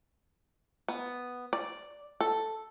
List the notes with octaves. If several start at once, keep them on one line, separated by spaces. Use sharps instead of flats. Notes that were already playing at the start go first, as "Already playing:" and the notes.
B3
D5
A4